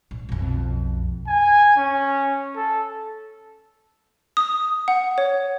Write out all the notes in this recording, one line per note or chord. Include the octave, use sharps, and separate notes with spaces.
A#1
B1 F2
G#5
C#4
A4
D#6
F#5
C#5